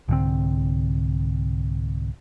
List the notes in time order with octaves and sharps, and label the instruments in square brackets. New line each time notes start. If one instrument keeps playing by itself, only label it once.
[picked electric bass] C2 G#2 D3 C4